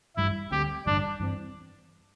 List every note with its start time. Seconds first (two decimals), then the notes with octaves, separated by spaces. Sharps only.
0.16 A1 G2 G3 E4
0.51 D2 D3 G3 C4 G4
0.86 A1 G2 D3 G3 D4
1.20 G2 E3 C4